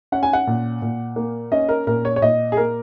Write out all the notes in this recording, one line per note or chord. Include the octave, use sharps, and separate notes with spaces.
C#4 F#5
G#5
F#5
A#2
A#2
A#3
C#4 D#5
A#4
A#2 A#4
C#5
C#5
A#2 D#5
G#4
A#3 A#4